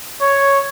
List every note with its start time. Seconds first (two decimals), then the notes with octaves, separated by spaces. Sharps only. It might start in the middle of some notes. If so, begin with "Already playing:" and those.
0.21 C#5